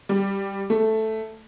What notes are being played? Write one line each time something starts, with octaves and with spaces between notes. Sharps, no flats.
G3
A3